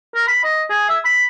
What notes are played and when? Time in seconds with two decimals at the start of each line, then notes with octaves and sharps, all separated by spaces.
0.15 A#4
0.28 B5
0.44 D#5
0.70 G#4
0.89 E5
1.05 B5